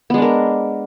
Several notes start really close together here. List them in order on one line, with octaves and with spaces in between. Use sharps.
B3 G#3 D4 A#4